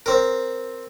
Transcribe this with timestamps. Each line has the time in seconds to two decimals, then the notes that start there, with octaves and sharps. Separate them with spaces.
0.06 C4 A#4